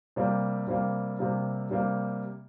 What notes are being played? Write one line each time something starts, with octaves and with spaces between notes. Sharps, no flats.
C3 G3 A#3
C3 G3 A#3
C3 G3 A#3
C3 G3 A#3